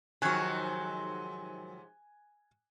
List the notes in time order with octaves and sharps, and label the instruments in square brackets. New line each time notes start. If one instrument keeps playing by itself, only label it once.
[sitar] G#2 C3 F3 [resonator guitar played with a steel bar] D#3 F#3 [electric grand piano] G#5 F#6 G#6